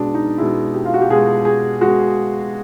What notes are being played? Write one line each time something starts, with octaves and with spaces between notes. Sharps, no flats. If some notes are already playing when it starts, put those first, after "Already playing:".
Already playing: B2 G#3 D4
D#4
B2 G#3 E4
G4
F4
F#4
G4
B2 G#3 G#4
G#4
B2 G#3 F#4